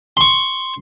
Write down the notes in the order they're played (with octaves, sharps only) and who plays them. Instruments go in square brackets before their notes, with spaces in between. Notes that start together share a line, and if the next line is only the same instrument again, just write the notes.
[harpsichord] C6 C#6